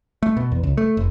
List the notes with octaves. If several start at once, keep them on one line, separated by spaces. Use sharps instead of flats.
A3
B2
E2
C#2
A3
F1